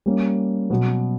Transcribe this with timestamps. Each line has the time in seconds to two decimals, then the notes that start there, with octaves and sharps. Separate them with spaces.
0.06 G3 A#3 C#4
0.70 B2 F#3 B3